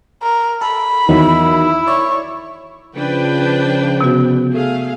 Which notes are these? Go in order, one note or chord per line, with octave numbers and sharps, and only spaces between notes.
A#4
A4 B5
E2 D#3 F#3 E4
C#5 D5
C#3 F3 D4 B4 G5
C3 B3 F#4
A3 G#4 F5